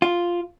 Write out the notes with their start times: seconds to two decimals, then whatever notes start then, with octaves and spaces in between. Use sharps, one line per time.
0.02 F4